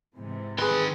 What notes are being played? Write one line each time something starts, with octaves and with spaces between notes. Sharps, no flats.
G#2 C3 E3
D#3 G#4 B4 C6